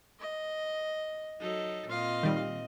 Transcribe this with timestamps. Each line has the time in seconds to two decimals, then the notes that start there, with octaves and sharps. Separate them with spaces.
0.20 D#5
1.40 F#3 D#4 A4
1.89 A#2 C4 F4 D#5 F5
2.23 D#3 G3